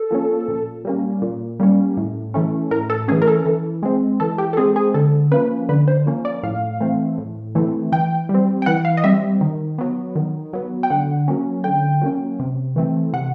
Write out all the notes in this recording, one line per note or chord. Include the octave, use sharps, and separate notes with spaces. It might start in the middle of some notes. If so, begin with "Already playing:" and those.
Already playing: A4
F3 A#3 C#4
A#2
G3 A#3 C#4
A#2
G3 A#3 C#4
A2
E3 A3 C#4
A2 A#4
A4
E3 A3 C#4 G#4
A#4
A4
E3
G#3 C4
E3 A4
G4
A4
G#3 C4 G#4
G#4
D3 A4
F3 A#3 C#4 B4
D3 B4
C5
F3 A#3 C#4
D5
A2 F5
E3 A3 C4
A2
E3 A3 C4
E3 G5
G3
C4
G5
E3 F#5
F5
D#5
G3 C4 E5
D#3
F#3 B3
D#3
F#3 B3
G5
D3 F#5
F#3 A#3 C#4
D3 G5
F#3 A#3 C#4
C3
E3 A3 C4
C3 F#5